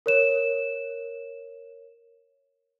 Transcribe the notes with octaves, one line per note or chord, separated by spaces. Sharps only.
A#4 C#5 E7